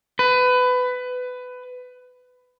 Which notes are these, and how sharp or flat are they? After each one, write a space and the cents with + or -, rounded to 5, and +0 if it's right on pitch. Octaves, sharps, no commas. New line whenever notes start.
B4 +20